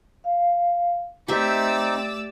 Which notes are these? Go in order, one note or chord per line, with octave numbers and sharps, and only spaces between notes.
F5
A3 C4 D#4 G4 D5 E5 E6